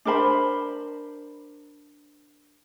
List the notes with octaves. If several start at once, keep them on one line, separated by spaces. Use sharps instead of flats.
D4 A#4 C5 B5